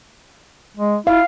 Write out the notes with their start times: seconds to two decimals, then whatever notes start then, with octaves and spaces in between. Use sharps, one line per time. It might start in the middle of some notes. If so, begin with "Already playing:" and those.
0.77 G#3
1.07 E4 F5